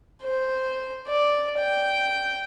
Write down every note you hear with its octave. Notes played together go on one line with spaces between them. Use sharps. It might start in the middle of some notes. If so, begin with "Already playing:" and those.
C5
D5
G5